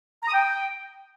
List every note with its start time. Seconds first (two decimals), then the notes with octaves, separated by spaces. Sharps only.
0.23 A#5
0.28 D#6
0.34 G5